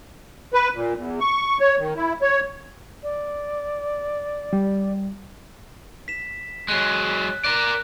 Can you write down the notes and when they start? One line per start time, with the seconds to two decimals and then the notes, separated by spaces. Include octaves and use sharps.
0.54 B4
0.75 A#2
0.96 E2
1.20 C#6
1.60 C#5
1.79 D#3
1.96 E4
2.22 C#5
3.03 D5
4.53 G3
6.08 B6 E7
6.68 F#3 G#3 F#6
7.45 A#4 D5 F#6